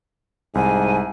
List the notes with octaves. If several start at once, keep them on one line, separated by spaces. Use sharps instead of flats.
C2 G#2 G#5